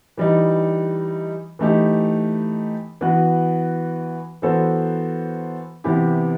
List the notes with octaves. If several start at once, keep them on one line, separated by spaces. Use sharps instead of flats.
E3 G3 D#4
E3 A3 D#4 G4
E3 B3 F#4 B4
E3 B3 F#4 A4 C5
C3 E3 B3 E4 G4